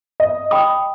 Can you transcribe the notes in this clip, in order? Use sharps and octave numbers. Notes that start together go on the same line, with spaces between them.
D#5
G5 B5 D#6